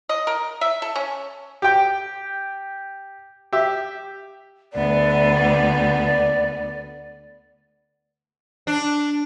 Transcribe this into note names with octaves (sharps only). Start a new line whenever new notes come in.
D#5
A#4
E5
A4
C#4
G4 G5
G4 E5
D2 B3 D5
D4